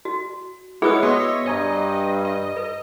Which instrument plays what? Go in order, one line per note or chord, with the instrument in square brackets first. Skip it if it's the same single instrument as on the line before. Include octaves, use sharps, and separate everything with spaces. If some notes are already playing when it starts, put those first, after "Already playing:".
[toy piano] F#4
[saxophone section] G#3 B3 [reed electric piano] E4 F#4 [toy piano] G#4 B4 D#6 [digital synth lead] C#5
[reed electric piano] B3 [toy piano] F#4 [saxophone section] D#5 E5
[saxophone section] G2 [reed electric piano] C5 G#5 A#5 [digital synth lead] D#5
[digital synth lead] D#5
[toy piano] B4